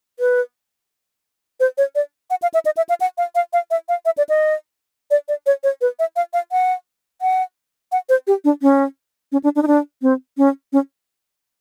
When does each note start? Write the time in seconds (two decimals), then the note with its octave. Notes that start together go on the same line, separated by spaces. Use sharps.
0.20 B4
1.60 C5
1.78 C#5
1.95 D5
2.30 F#5
2.42 F5
2.54 E5
2.65 D#5
2.77 E5
2.89 F5
3.01 F#5
3.18 F5
3.35 F5
3.53 F5
3.71 E5
3.89 F5
4.05 E5
4.18 D5
4.29 D#5
5.11 D5
5.28 D5
5.46 C#5
5.63 C#5
5.81 B4
5.99 E5
6.16 F5
6.33 F5
6.52 F#5
7.22 F#5
7.92 F#5
8.09 C5
8.27 G4
8.44 D4
8.62 C#4
9.32 C#4
9.44 D4
9.56 D4
9.63 D#4
9.67 D4
10.02 C4
10.37 C#4
10.73 C#4